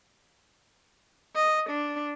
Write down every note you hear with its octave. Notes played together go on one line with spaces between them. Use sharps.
D#5
D4